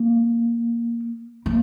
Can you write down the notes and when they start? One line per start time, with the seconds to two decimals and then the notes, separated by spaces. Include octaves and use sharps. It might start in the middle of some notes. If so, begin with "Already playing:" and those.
Already playing: A#3
1.46 A#3